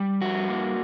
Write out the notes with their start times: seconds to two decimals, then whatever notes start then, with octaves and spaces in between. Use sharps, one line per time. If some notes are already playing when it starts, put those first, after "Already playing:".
Already playing: G3
0.21 G2 F#4
0.49 A#3